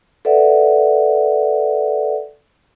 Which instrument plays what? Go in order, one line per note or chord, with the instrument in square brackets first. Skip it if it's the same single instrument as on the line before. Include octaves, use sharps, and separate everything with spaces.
[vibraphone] A4 B4 D5 E5 F#5